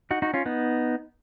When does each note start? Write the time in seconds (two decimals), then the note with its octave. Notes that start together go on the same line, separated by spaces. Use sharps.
0.11 D#4 F#4
0.22 D#4 F#4
0.34 C#4 F4
0.46 B3 D#4